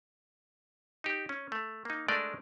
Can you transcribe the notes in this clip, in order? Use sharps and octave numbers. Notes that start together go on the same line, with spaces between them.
D#4 G4
C#4
A3
A#3 D#4
G#3 A3 D4 A#4 D5 D#5